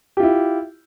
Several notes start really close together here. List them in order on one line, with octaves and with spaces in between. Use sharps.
G4 F4 E4